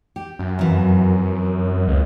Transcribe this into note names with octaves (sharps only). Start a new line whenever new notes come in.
G4
F#2
F2 E3
C#2